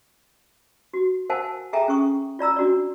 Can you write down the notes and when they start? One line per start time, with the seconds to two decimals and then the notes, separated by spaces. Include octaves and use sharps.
0.94 F#4
1.30 A#4 C5 F5 F#5 G#5 A5
1.73 G#4 A4 E5 G5 G#5 A#5
1.88 C#4 G#4 C#6 D#6
2.39 F4 D5 A#5 E6
2.56 D4 F#4 D5